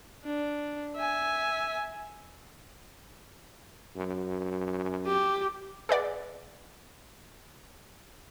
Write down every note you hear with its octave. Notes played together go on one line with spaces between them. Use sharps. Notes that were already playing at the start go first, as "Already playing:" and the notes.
D4
E5 G#5
F#2
G4
G#4 B4 D5 F#5